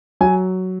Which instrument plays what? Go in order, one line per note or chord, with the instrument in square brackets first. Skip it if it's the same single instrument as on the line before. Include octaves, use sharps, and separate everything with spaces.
[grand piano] F#3 G#5